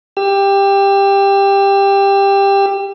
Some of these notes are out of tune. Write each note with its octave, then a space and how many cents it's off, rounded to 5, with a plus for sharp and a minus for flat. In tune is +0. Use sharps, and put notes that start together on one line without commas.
G4 +15 E6 +45